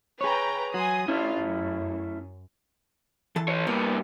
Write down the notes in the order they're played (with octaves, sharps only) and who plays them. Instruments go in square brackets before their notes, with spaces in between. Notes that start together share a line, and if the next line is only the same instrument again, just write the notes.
[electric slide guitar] G#4 C#5 [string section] B4 G5 A#5
[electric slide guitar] F#3 [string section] G#5 C6 D#6
[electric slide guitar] A3 C#4 E4 [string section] D4 F4
[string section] F#2
[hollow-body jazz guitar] E3 A4 A5
[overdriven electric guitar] B4 C#5
[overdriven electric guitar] G2 A#3 [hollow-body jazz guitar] B3